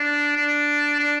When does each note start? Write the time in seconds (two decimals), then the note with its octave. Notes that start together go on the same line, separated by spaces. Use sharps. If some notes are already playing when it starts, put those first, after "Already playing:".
Already playing: D4
0.36 D4
0.99 D4